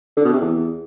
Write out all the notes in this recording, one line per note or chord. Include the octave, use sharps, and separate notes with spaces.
D3
B2
C3
E2